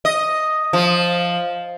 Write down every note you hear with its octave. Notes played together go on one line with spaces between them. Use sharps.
D#5
F3